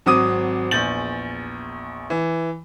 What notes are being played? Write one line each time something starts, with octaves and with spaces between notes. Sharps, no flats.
G#1 F#3 C4 D6 D#6 D#7
A#1 E2 G6 A6 F#7
E3